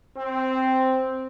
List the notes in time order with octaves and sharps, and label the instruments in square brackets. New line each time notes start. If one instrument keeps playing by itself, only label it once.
[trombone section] C4